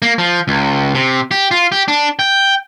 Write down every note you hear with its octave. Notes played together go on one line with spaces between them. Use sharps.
A#3
F3
C#2
C3
G4
F4
G4
D4
G5